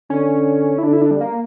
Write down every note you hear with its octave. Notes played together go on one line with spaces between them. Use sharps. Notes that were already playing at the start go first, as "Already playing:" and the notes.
D3 C#4
E4
D3 D4
E4
D4
G3
A#3